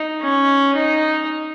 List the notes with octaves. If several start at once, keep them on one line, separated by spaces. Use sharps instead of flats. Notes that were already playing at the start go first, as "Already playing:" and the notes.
Already playing: D#4
C#4
D#4